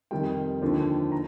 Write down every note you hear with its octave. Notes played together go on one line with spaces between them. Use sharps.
F2 C3 D#3 G3 G5
D#2 D3 F3
A#5